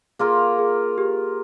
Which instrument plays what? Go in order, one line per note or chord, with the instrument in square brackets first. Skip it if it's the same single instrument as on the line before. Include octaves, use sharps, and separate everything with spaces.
[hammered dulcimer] A#3 F4 A#4 [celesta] G#4
[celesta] G#4
G4